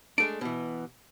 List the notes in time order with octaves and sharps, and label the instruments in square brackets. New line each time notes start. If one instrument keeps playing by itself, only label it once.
[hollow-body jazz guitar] G#3 A3 D4 [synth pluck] D7
[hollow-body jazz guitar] B2 E3